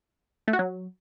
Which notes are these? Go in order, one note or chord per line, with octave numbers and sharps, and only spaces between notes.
A3
F#4
F#3